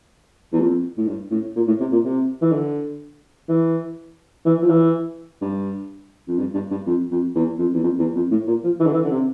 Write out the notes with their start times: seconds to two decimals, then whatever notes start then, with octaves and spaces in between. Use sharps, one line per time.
0.52 E2
0.60 F2
0.98 A2
1.07 G2
1.31 A2
1.56 A#2
1.67 A2
1.80 C3
1.92 A#2
2.04 C3
2.42 E3
2.52 D3
3.49 E3
4.45 E3
4.62 F3
4.69 E3
5.41 G2
6.27 F2
6.38 G2
6.54 G2
6.71 G2
6.86 F2
7.11 F2
7.35 E2
7.58 F2
7.73 E2
7.83 F2
7.98 E2
8.15 F2
8.31 A2
8.47 A#2
8.64 F3
8.79 E3
8.86 D3
8.94 E3
9.04 D3
9.11 C3